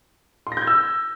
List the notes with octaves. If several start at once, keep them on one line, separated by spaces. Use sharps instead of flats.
C6
A#6
G6
G#6
E6